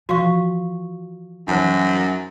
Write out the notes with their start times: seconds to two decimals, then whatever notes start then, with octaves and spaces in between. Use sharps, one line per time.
0.09 E3 F3 F#4 F5 C#6
1.48 F#2 E3 G3 D#4 C5